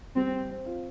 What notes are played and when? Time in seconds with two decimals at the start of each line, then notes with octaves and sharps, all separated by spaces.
0.16 G3 C4
0.34 C4
0.50 C4
0.66 F4